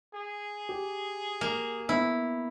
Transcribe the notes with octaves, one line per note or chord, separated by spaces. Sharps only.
G#4
G4
A#3
B3 E4